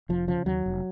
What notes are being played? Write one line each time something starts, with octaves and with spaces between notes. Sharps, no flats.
F1 F3
C#3 F3
D#2 F#3
F1